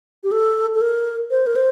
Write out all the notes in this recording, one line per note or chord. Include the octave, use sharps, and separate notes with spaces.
G4
A4
A4
A#4
C5
A#4
C5